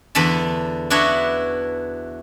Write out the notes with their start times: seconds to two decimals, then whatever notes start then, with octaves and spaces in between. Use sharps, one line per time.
0.15 E2 D3 A4 A5 B5
0.90 B3 D4 E4 F#4 C#5